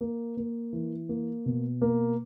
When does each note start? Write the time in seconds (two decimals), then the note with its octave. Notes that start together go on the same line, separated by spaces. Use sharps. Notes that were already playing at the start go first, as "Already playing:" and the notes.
0.01 A#3
0.37 A#3
0.73 E3
1.09 A#3
1.46 B2
1.82 A#3